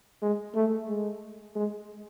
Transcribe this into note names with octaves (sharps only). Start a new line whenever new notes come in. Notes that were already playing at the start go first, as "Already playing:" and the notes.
G#3
A3
G#3
G#3